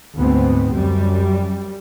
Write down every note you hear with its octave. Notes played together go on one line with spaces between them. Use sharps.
D2 G#2 B3 C4
F#2 G3